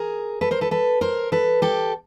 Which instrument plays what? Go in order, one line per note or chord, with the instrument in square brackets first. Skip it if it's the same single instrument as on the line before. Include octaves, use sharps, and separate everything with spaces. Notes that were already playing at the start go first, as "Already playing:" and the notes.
Already playing: [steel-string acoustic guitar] G#4 A#4
A4 B4
A#4 C5
A4 B4
A4 B4
A#4 C5
A4 B4
G4 A4